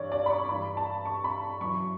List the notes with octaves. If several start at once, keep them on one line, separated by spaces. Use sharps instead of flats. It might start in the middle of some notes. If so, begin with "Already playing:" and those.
Already playing: G2 E3 C#5 D5
D5
B5
C#6
G2 E3 B5
A5
C#6
B5
F#2 E3 C#6